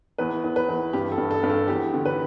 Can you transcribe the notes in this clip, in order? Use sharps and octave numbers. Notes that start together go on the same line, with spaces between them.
E2 B4
E2
B4
E2
G2 G4
A4
G2
A4
G2
A4
E2 G4
D3
B4